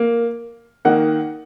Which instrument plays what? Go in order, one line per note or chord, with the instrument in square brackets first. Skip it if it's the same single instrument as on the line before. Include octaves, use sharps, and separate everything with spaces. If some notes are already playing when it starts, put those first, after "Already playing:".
Already playing: [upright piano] A#3
D#3 A#3 D#4 F#5